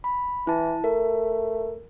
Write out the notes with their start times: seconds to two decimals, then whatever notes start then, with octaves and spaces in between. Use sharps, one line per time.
0.04 B5
0.47 E3 E4 A5
0.84 A3 A#4